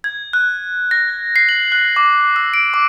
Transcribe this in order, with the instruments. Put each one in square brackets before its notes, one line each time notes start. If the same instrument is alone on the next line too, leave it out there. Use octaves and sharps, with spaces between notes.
[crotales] G#6
F#6
A#6
C7
F#7
F#6
D6
E6
D7
D6